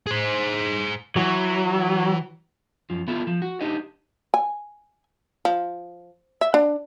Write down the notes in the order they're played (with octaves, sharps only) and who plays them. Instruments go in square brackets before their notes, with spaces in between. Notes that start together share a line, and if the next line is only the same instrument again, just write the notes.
[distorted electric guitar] G#4 C5
[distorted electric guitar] E3 [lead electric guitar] F#3
[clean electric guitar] F#2 F3
B3 E4 F4 A4
F3
F#4
D4 D#4 G4 C5 D#5
[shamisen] G#5
F3
E5
D4